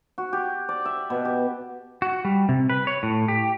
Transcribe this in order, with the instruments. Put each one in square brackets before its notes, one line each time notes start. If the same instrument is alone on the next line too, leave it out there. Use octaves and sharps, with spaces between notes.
[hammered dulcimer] F#4
G4
D5
E5
B2
G4
[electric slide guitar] F#4
G3
C3
B4
C#5
A2
G4